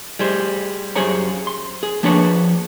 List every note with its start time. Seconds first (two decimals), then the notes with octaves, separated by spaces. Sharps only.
0.19 G3 G#4 C5
0.96 F#2 G#4 C5 C#5 A#5
1.47 C6
1.83 G#4
2.03 F3 A#3 D4 G#4 B4 C#5